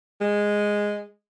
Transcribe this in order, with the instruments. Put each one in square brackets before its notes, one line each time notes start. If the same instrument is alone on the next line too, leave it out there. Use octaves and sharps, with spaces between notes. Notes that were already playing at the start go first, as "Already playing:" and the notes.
[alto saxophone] G#3